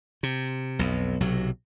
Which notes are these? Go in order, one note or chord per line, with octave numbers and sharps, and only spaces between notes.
C3
B1 F2
B1 C3 F#3